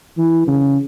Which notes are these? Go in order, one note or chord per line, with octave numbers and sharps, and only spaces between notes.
E3
C#3